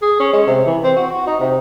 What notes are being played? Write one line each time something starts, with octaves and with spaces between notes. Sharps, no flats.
G#4
C#4
G#3
C3
E3
C4
F#4
F#4
D#4
C3